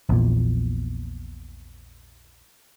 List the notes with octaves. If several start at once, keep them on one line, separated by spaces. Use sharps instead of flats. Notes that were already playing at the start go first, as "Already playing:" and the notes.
A#1 E2 A#2